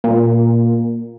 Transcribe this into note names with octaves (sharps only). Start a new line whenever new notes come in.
A#2